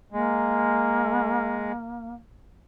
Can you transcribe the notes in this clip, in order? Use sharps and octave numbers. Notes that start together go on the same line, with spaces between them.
G#3 A#3